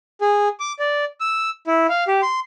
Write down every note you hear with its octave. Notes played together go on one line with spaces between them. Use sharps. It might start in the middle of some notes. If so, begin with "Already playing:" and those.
G#4
D6
D5
E6
E4
F5
G4
C6